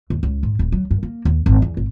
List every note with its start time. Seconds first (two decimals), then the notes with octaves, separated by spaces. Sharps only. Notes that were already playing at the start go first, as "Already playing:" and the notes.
0.10 D#2
0.23 C#2
0.43 G#2
0.59 D1
0.72 F#3
0.91 G2
1.03 A#3
1.25 D#2
1.46 G#1
1.62 E2
1.77 G#1